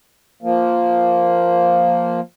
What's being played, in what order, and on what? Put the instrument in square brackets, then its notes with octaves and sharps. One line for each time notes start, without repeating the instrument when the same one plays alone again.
[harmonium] F3 A#3